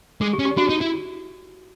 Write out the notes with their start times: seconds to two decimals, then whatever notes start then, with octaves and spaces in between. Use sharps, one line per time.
0.21 G#3 G#4
0.33 G4
0.39 C#4
0.45 G4
0.57 D4 F#4
0.69 D#4
0.81 E4